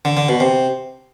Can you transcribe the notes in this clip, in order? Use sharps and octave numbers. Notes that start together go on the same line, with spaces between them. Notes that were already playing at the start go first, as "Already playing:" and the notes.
D3
D3
B2
C3